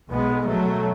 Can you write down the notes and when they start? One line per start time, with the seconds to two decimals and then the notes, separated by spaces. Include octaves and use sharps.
0.11 B1 B2 G#3 B3
0.48 F#3 A3